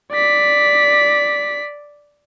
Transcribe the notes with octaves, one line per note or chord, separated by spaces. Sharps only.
D5 B6